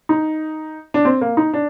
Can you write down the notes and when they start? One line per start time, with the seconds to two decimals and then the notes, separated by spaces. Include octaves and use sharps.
0.09 D#4
0.94 D4
1.05 C4
1.21 A#3
1.37 D#4
1.54 D4